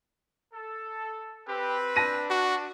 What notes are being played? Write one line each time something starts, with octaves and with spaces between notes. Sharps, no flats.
A4
C4 G4 B4
D4 A5 A#6 D#7
F#4